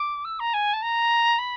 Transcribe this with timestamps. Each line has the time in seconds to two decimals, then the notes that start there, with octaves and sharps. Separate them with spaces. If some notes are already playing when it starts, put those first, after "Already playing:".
Already playing: D6
0.25 E6
0.39 A#5
0.54 G#5
0.73 A5
0.82 A#5
1.38 B5